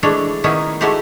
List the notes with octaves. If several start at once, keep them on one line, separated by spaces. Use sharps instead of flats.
E3 G#3 A3 D4 C#5
D#3 B3 C#4 D#4 E4
G#3 A3 E4 F#4 G4 C5